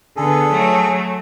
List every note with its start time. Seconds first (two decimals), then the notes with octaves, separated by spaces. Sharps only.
0.17 D3 B3 G#4 A4
0.51 F#3 A3